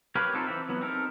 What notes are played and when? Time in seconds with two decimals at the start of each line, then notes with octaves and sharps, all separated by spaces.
0.15 G4 A#4 B4 C#5 F5
0.34 C4 D#4 F4 A4
0.47 E3 C4 E5
0.69 E3 F#3 B3
0.81 C4 D#4 G4 A4 A#4